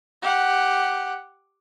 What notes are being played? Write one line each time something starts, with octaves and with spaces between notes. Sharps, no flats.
G4 F#5